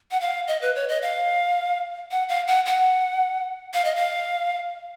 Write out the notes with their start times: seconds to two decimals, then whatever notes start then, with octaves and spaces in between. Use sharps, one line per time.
0.11 F#5
0.21 F5
0.48 D#5
0.62 B4
0.75 C#5
0.89 D#5
1.02 F5
2.11 F#5
2.29 F5
2.48 F#5
2.66 F#5
3.74 F5
3.85 D#5
3.96 F5